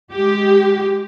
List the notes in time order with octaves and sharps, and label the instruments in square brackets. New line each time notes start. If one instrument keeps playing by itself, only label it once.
[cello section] G#3 G4